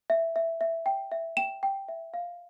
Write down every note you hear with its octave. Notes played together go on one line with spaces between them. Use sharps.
E5
E5
E5
G5
E5
G5 E7
G5
E5
F5